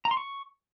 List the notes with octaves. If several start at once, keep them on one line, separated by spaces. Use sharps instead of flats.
A#5
C6
C#6